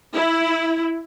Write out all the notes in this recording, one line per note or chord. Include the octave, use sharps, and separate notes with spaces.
E4